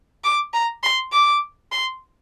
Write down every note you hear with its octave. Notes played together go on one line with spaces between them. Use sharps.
D6
A#5
C6
D6
C6